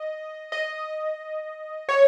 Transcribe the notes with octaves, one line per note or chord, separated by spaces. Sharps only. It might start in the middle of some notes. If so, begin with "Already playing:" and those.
Already playing: D#5
D#5
C#5